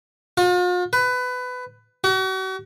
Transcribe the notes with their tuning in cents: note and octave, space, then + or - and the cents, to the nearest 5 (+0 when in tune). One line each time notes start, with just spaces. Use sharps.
F4 +45
B4 +20
F#4 +40